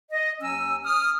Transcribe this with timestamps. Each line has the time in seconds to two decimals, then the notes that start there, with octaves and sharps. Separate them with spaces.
0.11 D#5
0.41 D#2 F#3 C#4 G#5 E6
0.85 D#6 F6